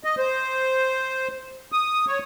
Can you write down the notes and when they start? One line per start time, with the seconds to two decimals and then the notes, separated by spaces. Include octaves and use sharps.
0.04 D#5
0.18 C5
1.72 D#6
2.07 C#5